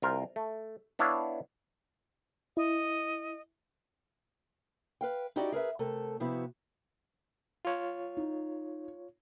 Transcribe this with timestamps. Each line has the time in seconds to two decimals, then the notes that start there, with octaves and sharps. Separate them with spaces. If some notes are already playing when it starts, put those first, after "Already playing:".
0.02 C2 F4 A#4 C5
0.36 A3
0.99 B3 D4 E4 C#5 F5
2.57 E4 D#5
5.01 B4 F5 G5
5.36 D#4 E4 F#4 G4 D5 D#5
5.52 G#4 A#4 B4 E5
5.79 C3 A3 A4 A#4
6.20 C3 F3 B3 E4 F#4
7.65 F4 C#5
8.17 D#4